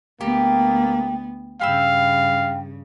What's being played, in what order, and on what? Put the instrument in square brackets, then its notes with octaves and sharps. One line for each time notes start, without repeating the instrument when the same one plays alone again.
[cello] D2 B3 [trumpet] A#3 [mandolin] G4
[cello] G2 C#3 [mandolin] G4 B5 E6 [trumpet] F5